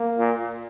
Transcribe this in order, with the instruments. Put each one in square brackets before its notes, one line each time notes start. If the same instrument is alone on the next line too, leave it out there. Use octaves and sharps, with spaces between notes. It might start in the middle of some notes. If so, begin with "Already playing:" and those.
Already playing: [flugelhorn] A#3
[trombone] A#2